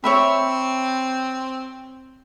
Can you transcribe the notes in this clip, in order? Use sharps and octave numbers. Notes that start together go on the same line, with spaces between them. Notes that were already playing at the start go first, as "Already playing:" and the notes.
C4 C#5 E5 B5